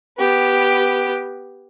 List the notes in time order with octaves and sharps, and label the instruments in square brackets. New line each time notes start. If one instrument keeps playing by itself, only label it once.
[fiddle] B3 G4